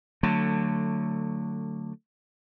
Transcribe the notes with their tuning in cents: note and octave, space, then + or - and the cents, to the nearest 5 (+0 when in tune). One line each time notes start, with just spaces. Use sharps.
D3 +15 F#3 +0 A3 +25